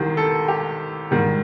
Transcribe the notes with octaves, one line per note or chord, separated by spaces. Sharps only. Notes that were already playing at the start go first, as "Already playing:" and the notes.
Already playing: C2 C3 D#3
A4
G4
G#2 D#3 G3